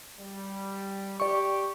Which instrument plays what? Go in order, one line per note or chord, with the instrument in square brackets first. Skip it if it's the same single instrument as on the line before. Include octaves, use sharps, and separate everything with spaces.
[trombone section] G3
[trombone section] G4 [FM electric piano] D5 C#6